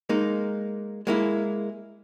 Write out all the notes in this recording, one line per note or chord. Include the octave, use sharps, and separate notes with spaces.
G#3 A#3 D#4
G#3 A#3 E4